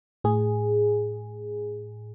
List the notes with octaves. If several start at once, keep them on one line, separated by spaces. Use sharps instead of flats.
A2 G#4